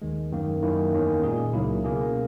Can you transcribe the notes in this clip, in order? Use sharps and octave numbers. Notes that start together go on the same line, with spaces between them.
D#2 D#3 G#3
F#2 D#3 A#3
F#2 D#3 A#3 C#4 E4
E2 D#3 A#3 C#4
A#2 G#3 D#4 G#4
C#2 C#3 F#3 A#3 E4
B2 A#3 C#4 G#4